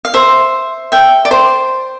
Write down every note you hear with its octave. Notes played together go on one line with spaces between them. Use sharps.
F5
C5 E5
E5 G5
D5
C5